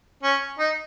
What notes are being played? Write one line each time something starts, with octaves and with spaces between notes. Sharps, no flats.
C#4
D#4